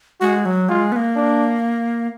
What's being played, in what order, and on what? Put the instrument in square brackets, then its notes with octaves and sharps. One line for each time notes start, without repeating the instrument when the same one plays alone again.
[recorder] G#3 [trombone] F#4
[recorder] F#3
[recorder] G#3 [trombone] F4
[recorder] B3
A#3
[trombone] D4